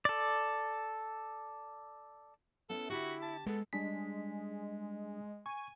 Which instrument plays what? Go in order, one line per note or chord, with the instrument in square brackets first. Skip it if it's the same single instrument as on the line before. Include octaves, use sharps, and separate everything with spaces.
[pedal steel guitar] A4 D5
[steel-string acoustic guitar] B3 C#4 E4 [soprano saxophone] A4
[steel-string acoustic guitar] D3 G4 [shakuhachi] E4 [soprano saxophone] F#4
[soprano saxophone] A5
[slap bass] G#3 [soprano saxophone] B3 [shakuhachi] A4
[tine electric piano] G3 D4 B6 [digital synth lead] G#3
[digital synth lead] G#5 [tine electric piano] C#6